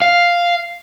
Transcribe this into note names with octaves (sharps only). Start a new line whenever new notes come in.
F5